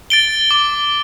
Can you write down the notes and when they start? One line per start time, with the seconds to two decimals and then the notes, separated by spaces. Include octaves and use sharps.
0.10 A6 D7 G7
0.51 D6